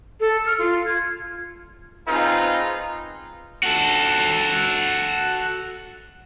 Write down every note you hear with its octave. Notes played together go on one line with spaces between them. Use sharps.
A4
F6
F4
G#6
C4 D#4 F4 G#4 B4
F#4 A4